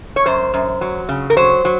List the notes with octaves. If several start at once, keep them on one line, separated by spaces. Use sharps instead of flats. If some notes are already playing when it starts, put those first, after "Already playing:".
C#5
F#2 C5
F#2
F#3
C#3
A#4
F#3 C5
F#3